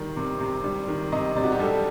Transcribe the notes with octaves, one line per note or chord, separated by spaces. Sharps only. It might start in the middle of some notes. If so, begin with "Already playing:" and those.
Already playing: D#3 G3
C3
C3
G3
D#3
C3 D#5
C3 D5
F#4
G4
G3 A4